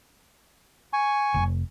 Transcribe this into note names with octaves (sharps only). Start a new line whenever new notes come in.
G#5 C#6
F1